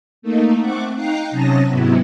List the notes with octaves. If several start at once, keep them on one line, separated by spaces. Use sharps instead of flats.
A3 A#3 D#4
A3 C4 F#5 C#6 D6
D#4 F5 G5 A#5 F#6 C7
C3 F#3 C#4 A5 D#6 A#6
G#2 C3 F#3 B3 E4